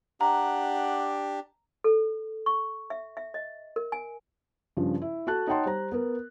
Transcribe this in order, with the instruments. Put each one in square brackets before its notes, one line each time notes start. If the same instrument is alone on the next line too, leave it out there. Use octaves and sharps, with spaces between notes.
[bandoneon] D4 G4 [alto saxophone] F#5 [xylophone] A#5
[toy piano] A4
C#6
E5
E5
D#5
A#4
G#5
[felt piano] G2 C#3 F3
E4
F#4 A4 A5 F#6
D#4 C#5 F#5 G5 A5 C6
G3 C5 A#5
B3 A#4